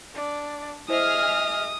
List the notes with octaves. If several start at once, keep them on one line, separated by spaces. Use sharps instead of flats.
D4 D5
E4 G#4 C5 D#5 E5 D#6 F6